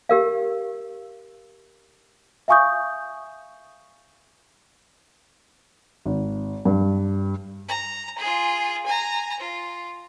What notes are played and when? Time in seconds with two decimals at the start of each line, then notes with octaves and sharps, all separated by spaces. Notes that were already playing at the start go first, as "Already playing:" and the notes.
0.09 G4 A#4 F5
2.48 E5 F5 G#5 C#6 D#6 G6
6.06 G#1
6.65 G2
7.69 A#5
8.19 F4 G#4
8.86 G#5 A#5
9.40 F4